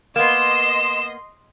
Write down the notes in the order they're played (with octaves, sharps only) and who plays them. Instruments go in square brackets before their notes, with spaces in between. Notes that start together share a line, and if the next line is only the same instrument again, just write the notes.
[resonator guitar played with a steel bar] A#3 B3 [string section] D#5 C6 [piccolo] E7